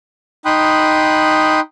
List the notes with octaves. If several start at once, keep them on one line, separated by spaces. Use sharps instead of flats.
D#4 G5 B5 C6 D#6 F#6